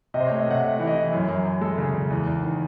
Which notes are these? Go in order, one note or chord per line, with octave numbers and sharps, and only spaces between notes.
C3 D#5
C5
C#5
A3
D#5
C3 F#5
A3
E3
D#5
E3
F#2
F#2
F#2
G#3 A4
C#3
C#3
E2
E2
D#3